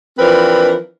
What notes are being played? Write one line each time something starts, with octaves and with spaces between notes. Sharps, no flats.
E3 F3 C4 D4 A#4 B4